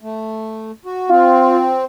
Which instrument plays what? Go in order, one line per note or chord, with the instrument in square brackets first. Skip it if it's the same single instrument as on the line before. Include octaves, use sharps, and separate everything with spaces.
[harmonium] A3
F#4
[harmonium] C4 [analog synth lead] F4